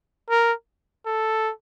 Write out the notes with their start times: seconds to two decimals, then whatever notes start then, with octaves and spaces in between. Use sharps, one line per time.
0.30 A#4
1.06 A4